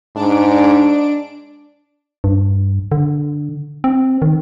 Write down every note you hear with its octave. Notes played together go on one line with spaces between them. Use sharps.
G#2 D4 D7
G2
D3
C4
D#3